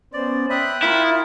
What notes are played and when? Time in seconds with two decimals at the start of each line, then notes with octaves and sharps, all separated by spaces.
0.13 B3 C#4 C5 D5
0.50 E5 G5 B5 D#6 F#6
0.83 E4 F4 A#4